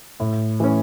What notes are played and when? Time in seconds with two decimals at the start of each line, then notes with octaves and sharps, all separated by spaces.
0.20 A2
0.60 E3 A3 C#4